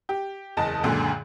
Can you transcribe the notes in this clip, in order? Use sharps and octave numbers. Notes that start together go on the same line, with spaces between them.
G4
F#1 E2 D#5 A5
C#2 F#2 A#2 D3